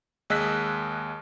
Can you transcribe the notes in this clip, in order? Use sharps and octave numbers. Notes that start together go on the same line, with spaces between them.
D#2 G#3 D#5 E6 F#6 B6